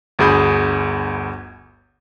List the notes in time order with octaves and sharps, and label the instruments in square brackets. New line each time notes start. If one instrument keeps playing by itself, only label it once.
[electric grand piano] G1 D2 G#4 B5 G6